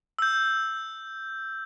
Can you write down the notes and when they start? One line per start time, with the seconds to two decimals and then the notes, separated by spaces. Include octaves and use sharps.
0.19 E6 G6